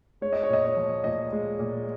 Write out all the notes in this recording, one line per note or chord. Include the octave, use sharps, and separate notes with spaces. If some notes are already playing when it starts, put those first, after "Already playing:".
G#3 C#5
D#5
C#5
A#2 D#5
C#5
F3
A#2 D#5
G#3
A#2